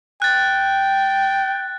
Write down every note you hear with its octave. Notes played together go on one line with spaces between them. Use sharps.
G5 F#6 A6